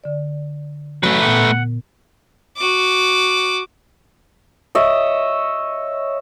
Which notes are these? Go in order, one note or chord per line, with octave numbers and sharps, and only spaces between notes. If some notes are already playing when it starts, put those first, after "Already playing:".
D3 D5
F#3 A3 B4
A#2 B3 F#5
F#4 D6
C#5 D#5 E5